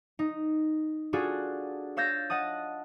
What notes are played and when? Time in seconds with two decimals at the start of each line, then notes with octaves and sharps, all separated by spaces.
0.19 D#4
1.13 D4 F4 F#4 G#4 A4
1.97 C#5 F5 E6 G6 A6 A#6
2.30 D#5 F#5 A5 D#6